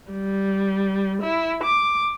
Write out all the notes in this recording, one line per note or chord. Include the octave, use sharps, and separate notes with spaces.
G3
E4
D6